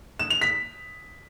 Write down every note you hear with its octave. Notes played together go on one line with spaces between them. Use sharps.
E7
F7
B6